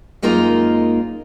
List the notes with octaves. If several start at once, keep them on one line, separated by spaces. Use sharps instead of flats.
F#2 G#3 A#3 D#4 F4 A#5